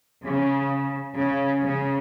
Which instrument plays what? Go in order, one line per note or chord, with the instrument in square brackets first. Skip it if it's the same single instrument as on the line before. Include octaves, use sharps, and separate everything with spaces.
[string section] C#3
C#3
C#3